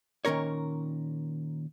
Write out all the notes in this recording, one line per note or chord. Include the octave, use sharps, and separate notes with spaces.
A#2 D#3 C#4 A#4 C#5